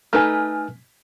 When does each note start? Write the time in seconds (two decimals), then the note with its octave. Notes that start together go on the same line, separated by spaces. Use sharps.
0.13 A3 D#4 B4 G#5 F6